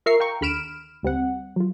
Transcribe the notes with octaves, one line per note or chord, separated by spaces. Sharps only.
F4 A#4 E5 A#5 C#6 C7
F5 G5 A#5 C#6
D#2 D3 B5 F6 D7 E7
D2 G3 C4 F#5
F#3 F4